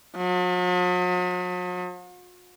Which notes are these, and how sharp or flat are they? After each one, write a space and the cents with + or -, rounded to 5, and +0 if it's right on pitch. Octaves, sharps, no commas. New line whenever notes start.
F#3 -45